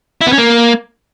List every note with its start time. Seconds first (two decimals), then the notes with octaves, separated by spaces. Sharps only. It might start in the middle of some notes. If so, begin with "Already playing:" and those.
0.21 E4
0.27 B3
0.32 C#4
0.38 A#3